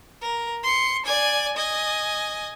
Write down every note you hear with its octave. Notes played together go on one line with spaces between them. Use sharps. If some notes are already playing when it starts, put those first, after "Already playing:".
A#4
C6 C#7
D5 G#5
D#5 G#5